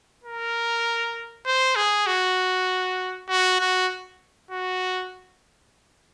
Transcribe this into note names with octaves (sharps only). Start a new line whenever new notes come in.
A#4
C5
G#4
F#4
F#4
F#4
F#4